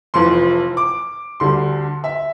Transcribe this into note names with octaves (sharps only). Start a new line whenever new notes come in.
F1 F2 E3 C6
D6
D2 D3 G3 C6
E5